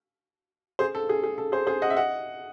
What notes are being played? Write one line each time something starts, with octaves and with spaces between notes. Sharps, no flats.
G#4 C5
A4
G#4
G#4
A4
G#4 C5
G#4 C5
D#5 F#5
E5
D#5 F#5